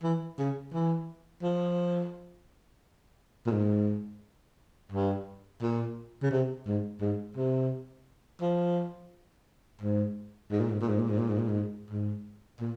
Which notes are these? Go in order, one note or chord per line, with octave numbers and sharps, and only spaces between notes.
E3
C#3
E3
F3
A#2
G#2
G2
A#2
C#3
C3
G#2
G#2
C3
F3
G#2
G#2
A#2
G#2
A#2
G#2
A#2
G#2
A#2
G#2
A#2
G#2
G#2
A#2